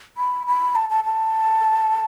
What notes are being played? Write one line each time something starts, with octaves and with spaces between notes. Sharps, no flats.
B5
B5
A5
A5
A5